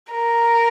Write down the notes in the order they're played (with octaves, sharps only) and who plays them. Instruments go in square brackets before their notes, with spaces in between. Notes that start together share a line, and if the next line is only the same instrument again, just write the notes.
[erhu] A#4